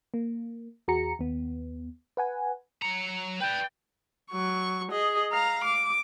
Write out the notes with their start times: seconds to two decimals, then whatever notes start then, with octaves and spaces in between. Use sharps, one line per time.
0.14 A#3
0.88 E2 F#4 G#4 A#5 C#7
1.19 D#2 B3
2.17 B4 F#5 G#5
2.82 F#3 A#5 C#7
3.40 B4 D5 G5
4.31 F#3 C#6
4.92 G#4 D#5
5.32 F5 A#5
5.64 D6